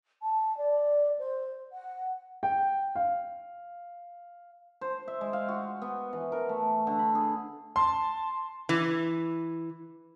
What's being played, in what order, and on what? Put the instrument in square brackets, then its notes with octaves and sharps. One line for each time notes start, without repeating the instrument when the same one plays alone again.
[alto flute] A5
D5
C5
F#5
[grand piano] G5
F5
[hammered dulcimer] C5
E5
G#3
F5
F#4
B3
E3
A#4
A3
D3
B5
G#4
[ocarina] A5 [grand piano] C6
[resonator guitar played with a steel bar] E3